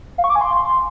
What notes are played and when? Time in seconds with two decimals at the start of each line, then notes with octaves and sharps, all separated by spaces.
0.18 F5
0.24 C#6
0.30 D6
0.35 G#5
0.41 C6